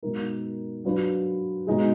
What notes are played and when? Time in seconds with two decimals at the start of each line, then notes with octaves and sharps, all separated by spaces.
0.03 B2 G#3 D#4 A#4
0.84 F#3 D4 F4 B4
1.67 B2 G#3 D#4 G#4